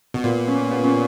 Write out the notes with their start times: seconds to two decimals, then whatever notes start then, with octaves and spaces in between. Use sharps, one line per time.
0.14 B2
0.24 A#2 B3
0.48 C#4
0.72 B3
0.84 C#4